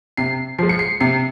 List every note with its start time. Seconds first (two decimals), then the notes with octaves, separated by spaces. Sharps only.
0.17 C3 C7
0.59 F3 G#3 C7
0.69 C#7
0.79 C7
1.01 C3 C7